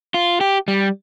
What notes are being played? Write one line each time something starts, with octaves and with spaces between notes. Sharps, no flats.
F4
G4
G3